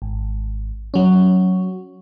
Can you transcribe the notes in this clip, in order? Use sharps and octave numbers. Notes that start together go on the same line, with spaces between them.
G#1
F#3 C#4